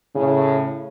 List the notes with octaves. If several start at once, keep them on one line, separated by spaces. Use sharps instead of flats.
A2 C#3